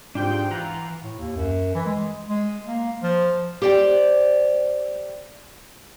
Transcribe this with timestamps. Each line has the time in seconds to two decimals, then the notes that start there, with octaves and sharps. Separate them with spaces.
0.15 G#2 D4 F4 G4 G5
0.51 E3 F4 F#5 A#5
1.03 A2
1.19 D#2
1.36 F#2
1.75 E3
1.86 G#3
2.28 G#3
2.66 A#3
3.03 F3
3.62 G4 C5 D5 F5 G5